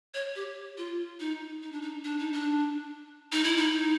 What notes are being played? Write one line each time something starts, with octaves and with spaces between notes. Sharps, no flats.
C#5
G4
F4
D#4
D#4
D4
D#4
D4
D#4
D4
D#4
E4
D#4